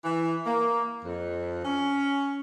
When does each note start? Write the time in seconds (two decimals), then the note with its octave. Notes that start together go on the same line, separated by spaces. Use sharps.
0.04 E3
0.45 A#3
1.03 F2
1.64 C#4